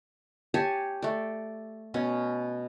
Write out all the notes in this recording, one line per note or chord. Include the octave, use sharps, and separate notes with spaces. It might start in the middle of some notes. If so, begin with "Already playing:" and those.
G4 C#5 G#5 A5
A3 D5
B2 C#4